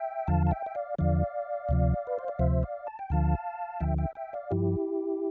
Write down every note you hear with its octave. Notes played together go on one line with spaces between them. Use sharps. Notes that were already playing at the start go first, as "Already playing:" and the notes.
Already playing: E5 G5
E2 D3 F3 F5 A5
A5
E5 G5
E5
D5 F5
E2 D3 F3 D5 F5
D2 C3 F3
B4
C5
D5
D2 C3 F3 C5 E5
D5 F5
A5
G5
D2 D3 F3 F5 A5
D2 D3 F3 E5 G5
E5 G5
E5 G5
D5 F5
G2 F3 E4 G4